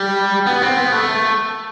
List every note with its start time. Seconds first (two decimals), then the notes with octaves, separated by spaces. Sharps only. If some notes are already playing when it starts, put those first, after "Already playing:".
Already playing: G3
0.46 B3
0.62 C4
0.78 B3
0.92 A3